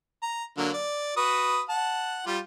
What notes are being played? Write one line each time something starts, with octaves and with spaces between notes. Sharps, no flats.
A#5
D3 F#3 A#3
D5
F#4 B4 D#6
F#5 A5
G3 F4